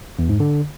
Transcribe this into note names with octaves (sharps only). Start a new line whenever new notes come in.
E2
G#2
D3